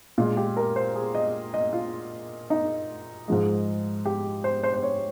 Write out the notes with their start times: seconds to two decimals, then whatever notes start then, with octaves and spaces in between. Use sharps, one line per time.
0.18 A#2 G#3 F4
0.37 G4
0.57 A#4
0.76 C5
0.95 G#4
1.15 D#5
1.54 D#5
1.73 F4
2.50 D#4
3.28 G#2 F3 G#3
4.05 G4
4.44 C5
4.64 C5
4.74 C5
4.83 C#5